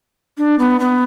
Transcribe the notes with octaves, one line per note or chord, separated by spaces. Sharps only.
D4
B3
B3